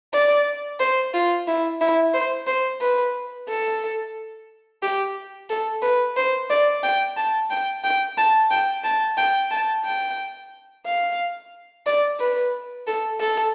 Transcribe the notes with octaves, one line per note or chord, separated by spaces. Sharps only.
D5
C5
F4
E4
E4
C5
C5
B4
A4
G4
A4
B4
C5
D5
G5
A5
G5
G5
A5
G5
A5
G5
A5
G5
F5
D5
B4
A4
A4